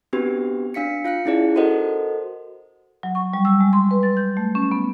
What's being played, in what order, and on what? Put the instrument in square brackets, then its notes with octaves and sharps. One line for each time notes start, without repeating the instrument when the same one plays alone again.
[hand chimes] B3 C4 D4 F#4 G4 B4
D4 F5 B6 C#7
F4 F5 F#6 C#7
C#4 D#4 E4 G#4 D5
F#4 A4 A#4 C5 D#5 F#5
[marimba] F#3
C#6
G3
E6
G#3
C6
B4
A6
G6
A3
C#4
B3